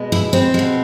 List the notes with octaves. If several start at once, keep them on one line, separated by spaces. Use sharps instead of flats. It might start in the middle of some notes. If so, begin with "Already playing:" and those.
Already playing: B2 G#3
E4
C4
B2 G#3